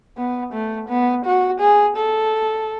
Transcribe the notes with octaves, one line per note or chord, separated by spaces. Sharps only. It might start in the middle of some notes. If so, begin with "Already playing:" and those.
B3
A3
B3
F#4
G#4
A4